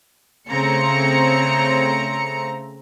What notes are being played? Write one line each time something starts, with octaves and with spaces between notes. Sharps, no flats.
C#3 A3 C4 A#5 C#7